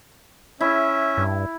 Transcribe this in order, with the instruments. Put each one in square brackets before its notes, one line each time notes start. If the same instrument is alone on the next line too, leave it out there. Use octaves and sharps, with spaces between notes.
[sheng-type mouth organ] C#4 E5 [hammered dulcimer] E4
[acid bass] G2